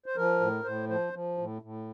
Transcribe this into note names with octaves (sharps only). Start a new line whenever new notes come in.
C5
F3 A#4
A2
A2 C5
F3 C5
F3
A2
A2